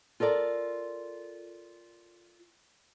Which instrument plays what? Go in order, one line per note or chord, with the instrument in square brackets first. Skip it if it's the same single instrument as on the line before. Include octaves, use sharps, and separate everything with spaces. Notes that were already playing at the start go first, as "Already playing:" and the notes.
[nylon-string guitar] F4 A4 A#4 D5